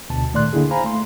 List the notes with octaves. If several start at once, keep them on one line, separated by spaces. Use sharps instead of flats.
D2 B2 A5
A#2 D#3 A3 D5 C6 F#6
D3 A#3 E4 G#4
C5 F5 G#5 A#5 B5
A3 C6